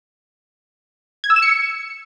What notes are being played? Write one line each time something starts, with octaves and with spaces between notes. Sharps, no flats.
G#6
E6
E7
C#7